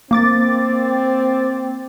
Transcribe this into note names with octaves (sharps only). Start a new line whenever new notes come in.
A#3 C4 D6 A6